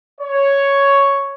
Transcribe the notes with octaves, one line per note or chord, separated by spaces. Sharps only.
C#5